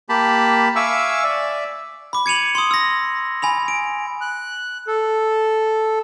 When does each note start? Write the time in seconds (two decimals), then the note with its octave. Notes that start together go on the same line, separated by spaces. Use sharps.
0.09 A#3 G4 A5 B5
0.76 E5 F5 G#5 C#6 D6 E6
1.24 D5 E5
2.13 B5 D6
2.26 G#6 C#7 D#7 F7 F#7
2.55 C6 D#6
2.71 E6 A#6
3.42 G#5 B5 F7
3.68 D7
4.21 F#6
4.88 A4